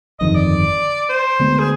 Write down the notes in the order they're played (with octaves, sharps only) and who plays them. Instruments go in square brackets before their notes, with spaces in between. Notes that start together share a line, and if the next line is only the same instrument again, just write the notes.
[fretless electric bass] G1 F2 D#3 [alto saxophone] D#5
[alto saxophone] D5
C5
[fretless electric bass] D2 D3 G#3 B3
[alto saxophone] G#4